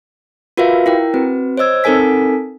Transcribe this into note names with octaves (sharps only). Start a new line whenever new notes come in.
F4 F#4 A#4 B4 E5 F5
E4 A#4 G5
C4 F#4 B4
C5 C#5 D#5 E6 G#6
C4 D#4 A4 A#4 G#5 B6